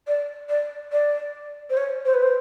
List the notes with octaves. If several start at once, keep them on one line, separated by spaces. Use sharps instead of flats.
D5
D5
D5
C5
C#5
C5
B4
C5